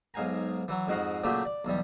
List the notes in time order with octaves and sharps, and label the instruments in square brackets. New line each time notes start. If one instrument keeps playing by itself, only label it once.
[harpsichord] B1 G#2 F5 G#5 A#5
E3 F#3
F2 G#2 F#4 D#5 F5 D#6
A#2 C#3 F#3 A3 G4
D5
B1 E2 G3